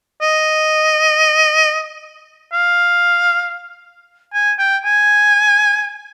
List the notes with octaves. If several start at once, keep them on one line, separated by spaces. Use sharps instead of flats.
D#5
F5
G#5
G5
G#5